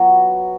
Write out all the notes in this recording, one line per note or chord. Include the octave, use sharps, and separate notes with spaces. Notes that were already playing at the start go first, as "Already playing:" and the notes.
Already playing: F#3 B3 F#4